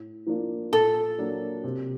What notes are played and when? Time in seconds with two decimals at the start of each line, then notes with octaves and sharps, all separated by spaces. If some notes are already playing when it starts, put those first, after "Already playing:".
Already playing: A2
0.27 F3 A#3 D4 F4
0.72 A#2 A4
1.18 F#3 A#3 D4
1.64 C3